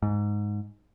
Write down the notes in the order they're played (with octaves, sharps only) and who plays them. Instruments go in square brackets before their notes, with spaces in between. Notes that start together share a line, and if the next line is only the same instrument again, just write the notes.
[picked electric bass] G#2